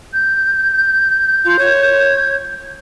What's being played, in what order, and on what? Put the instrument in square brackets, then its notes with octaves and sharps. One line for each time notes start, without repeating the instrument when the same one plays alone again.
[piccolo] G6
[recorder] F4
C#5